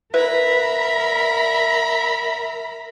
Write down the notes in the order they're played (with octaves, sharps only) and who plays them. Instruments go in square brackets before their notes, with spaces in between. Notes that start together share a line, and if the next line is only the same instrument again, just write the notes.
[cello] A#4 [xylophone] B4 [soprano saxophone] E5 [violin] A#5 B5